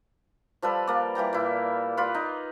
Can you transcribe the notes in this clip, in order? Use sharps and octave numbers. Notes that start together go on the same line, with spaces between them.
F3 G3 A4 B4
A#3 D5
E3 G3 G5 A#5
A#2 E4
F4 B4 D5
D#4